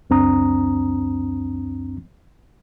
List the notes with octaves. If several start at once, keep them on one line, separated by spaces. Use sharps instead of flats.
C#2 F#2 C4 D4 A#5 D#6